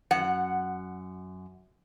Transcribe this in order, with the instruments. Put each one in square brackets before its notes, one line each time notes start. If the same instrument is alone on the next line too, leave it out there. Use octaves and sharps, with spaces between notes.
[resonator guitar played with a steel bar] F#2 F#5